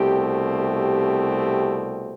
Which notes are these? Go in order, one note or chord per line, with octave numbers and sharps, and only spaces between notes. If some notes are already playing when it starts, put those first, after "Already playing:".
Already playing: C2 B2 A3 C4 G4
G4